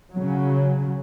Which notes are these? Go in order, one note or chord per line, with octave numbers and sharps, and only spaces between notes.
C#3 F#3